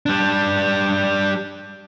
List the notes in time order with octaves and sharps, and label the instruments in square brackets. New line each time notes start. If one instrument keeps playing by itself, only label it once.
[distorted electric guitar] G3 D4